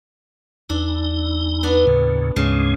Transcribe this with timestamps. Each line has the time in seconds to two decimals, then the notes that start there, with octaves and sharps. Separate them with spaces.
0.70 E2 D4 D#4
1.63 B3 D4
1.87 D#2 A2 C#3
2.36 D2 G#2 C#3 G#3